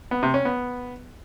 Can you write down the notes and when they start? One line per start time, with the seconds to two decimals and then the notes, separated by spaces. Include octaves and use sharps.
0.11 B3
0.23 C3
0.34 C#4
0.45 B3